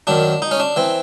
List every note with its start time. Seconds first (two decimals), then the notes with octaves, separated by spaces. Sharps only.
0.07 F#2 D#3 D4
0.42 D#4
0.51 C#4
0.60 D4
0.76 E3 C4